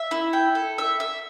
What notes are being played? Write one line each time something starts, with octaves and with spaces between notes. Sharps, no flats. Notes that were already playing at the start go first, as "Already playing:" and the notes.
Already playing: E5
E4
G5
A4
E5
E5